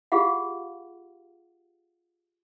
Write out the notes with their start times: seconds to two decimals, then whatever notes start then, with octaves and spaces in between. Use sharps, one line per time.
0.12 F4 G4 G#4 F5 F#5